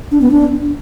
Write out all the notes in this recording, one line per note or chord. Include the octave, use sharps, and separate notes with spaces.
D4
B3
D4